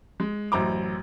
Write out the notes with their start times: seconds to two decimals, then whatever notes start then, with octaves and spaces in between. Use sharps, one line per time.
0.20 G#3
0.52 A1 F#2 C5 A#5 D6